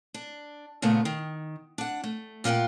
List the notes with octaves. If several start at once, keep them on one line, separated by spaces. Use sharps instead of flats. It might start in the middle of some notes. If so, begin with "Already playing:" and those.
D4
A#2 C#3 A3 B3
D#3
D4 F#5
A3
A#2 F4 F#4 F#5 G5